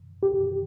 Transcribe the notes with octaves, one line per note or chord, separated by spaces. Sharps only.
G4